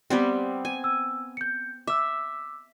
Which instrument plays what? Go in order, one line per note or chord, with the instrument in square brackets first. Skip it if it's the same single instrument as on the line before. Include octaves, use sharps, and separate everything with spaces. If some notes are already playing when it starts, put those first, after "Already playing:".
[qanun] G3 B3 C4
G#5
[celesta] E6
G6 C#7
[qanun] E5 [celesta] D6 E6